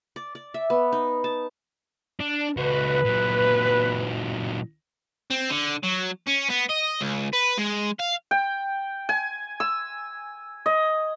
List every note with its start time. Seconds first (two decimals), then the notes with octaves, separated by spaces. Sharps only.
0.16 D5
0.35 D5
0.54 E5
0.70 B3
0.92 D#4
1.24 A5
2.21 D4
2.57 C#2 F#4 B4
3.05 A#2 F#3
5.31 C4
5.50 D3
5.84 F#3
6.28 C#4
6.50 B3
6.70 D#5
7.01 C#2
7.33 B4
7.58 G#3
8.00 F5
8.31 G5
9.09 G#5
9.60 E6
10.66 D#5